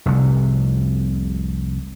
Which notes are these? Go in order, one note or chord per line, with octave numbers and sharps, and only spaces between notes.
F1 C2